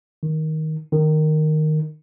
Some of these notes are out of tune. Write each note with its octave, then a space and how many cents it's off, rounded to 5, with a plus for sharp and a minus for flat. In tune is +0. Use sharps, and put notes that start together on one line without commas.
D#3 +10
D#3 -10